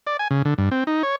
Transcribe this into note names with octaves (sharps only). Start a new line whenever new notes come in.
D5
G#5
C#3
D3
G2
C4
D#4
C#5